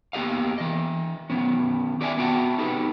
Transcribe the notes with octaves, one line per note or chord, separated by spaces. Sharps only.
A#3 B3 G4 D#5 F5
E3 D#5
D#3 B3 C#4
G4 B4 D5 E5 G5 G#5
B3 F#4 G5 A5
D#4 G4 A4 B4